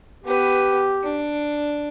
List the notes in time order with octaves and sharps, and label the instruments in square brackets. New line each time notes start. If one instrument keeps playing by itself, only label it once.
[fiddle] B3 B4 [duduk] G4
[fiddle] D4